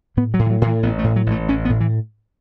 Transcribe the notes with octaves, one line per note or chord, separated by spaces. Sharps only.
A2 B3
F#3
A2
E3
F#3
A2 E3
A1 B3
A3
A2
F#3
A1 A3
A1 C#4
B3
A2
E3